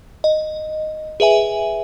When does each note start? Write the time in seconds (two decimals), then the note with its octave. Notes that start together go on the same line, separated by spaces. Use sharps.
0.24 D#5
1.20 G#4 B4 E5 G#5